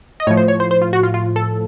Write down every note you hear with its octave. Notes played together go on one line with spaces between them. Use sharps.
D#5
A2 F3 C#5
C5
C#5
C5
C5
F4
F#4
F4
F4
A4